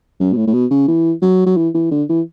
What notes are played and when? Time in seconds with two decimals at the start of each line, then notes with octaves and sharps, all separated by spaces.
0.20 F#2
0.33 B2
0.36 A2
0.47 A2
0.53 B2
0.71 C#3
0.88 E3
1.22 F#3
1.46 F#3
1.57 E3
1.74 E3
1.91 D3
2.09 E3